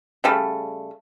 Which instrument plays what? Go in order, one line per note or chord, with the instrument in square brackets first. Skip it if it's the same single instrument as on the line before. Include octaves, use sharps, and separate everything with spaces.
[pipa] C#3 G3 A3